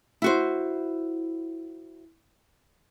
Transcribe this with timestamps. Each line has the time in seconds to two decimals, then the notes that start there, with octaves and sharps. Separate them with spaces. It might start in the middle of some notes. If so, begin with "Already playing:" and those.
0.22 E4 F#4 C5